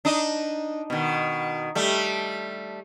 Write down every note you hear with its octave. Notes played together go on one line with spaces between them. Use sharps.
D4 D#4 D#5
B2 D#3
G3 A3